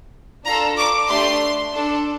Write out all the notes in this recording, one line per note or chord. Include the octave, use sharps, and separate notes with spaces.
D4 F4 A4 A#5
D6
A3 D4 G4 C6
D4 A4